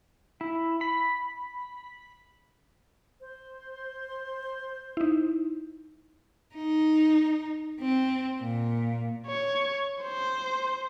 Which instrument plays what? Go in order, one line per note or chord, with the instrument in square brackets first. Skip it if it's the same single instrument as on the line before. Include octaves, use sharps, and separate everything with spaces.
[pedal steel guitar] E4
B5
[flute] C5
[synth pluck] D#4 E4
[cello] D#4
C4
A#2
[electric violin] C#5
C5